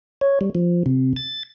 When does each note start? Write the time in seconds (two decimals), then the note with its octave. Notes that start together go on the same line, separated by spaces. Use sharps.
0.21 C#5
0.41 G3
0.55 F3
0.86 C3
1.16 A6